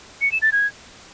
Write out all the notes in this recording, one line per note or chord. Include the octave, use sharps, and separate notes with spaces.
C#7
E7
A6
G#6